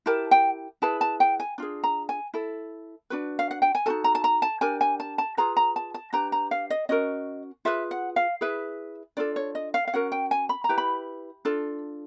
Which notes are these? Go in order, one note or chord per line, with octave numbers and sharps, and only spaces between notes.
E4 G4 A#4 A5
G5
E4 G#4 B4 A5
A5
G5
G#5
D4 F4 G#4
A#5
G#5
E4 A4
D4 F#4 B4
F5
F#5
G5
G#5
D#4 F#4 A4 A5
A#5
A5
A#5
A5
D4 G4 A#4 G#5
G#5
A5
A5
F4 G#4 B4 A#5
A#5
A5
A5
D4 G4 B4 A#5
A#5
F5
D#5
C#4 F#4 A#4 D#5
F4 G#4 B4 E5
F#5
F5
E4 G#4 B4 E5
D4 F4 A4 D5
C#5
D#5
F5
F5
C#4 F#4 A#4 F#5
G5
G#5
B5
A#5
E4 G4 B4
B5
D4 F4 A4